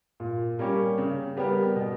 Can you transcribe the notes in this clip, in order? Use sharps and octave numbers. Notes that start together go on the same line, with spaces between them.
A#2
G3 A#3 C#4 G4
C#3
G3 B3 G4 A#4
B2